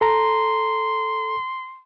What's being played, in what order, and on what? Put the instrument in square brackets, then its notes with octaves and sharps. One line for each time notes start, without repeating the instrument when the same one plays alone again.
[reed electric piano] A4 A#5 [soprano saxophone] C6